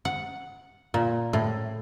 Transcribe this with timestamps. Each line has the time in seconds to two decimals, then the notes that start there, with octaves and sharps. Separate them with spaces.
0.05 F#5
0.94 A#2
1.33 A2